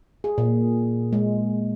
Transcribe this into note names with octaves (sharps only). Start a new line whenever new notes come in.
G#4
A#2
G#3